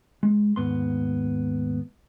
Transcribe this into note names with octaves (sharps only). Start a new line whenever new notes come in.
G#3
D#2 G#2 B3 C6